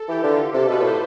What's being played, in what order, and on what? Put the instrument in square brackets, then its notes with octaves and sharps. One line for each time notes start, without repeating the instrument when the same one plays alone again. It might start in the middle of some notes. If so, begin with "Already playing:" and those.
Already playing: [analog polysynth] A4
[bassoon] E3 [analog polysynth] G4
[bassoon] D3 [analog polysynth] F4
[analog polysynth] G4
[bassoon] C3 [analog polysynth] A4
[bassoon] B2 [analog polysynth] B4
[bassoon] A2 [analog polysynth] C5